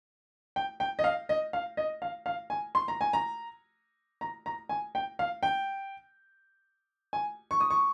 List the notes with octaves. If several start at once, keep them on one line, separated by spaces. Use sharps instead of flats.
G5
G5
D#5
F5
D#5
F5
D#5
F5
F5
G#5
C6
A#5
G#5
A#5
A#5
A#5
G#5
G5
F5
G5
G#5
C#6
D#6
C#6